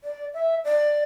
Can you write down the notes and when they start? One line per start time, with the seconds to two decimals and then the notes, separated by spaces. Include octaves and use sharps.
0.04 D5
0.34 E5
0.64 D5